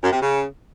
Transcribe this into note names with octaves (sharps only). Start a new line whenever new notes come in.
F#2
C3
C#3